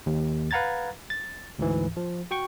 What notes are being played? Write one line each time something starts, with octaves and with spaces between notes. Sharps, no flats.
D#2
B4 F5 F#5 A#5 G#6 A6
A6
D2 G#2 E3
F3
F#4 G5 C#6